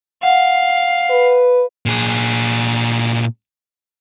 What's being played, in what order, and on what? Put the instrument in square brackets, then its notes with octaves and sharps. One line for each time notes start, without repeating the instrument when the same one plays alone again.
[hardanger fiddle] F5 [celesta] F#5
[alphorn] B4
[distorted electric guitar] A#2 G#4